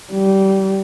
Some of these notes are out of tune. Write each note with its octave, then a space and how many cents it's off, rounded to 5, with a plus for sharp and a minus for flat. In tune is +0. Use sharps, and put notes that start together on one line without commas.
G3 -20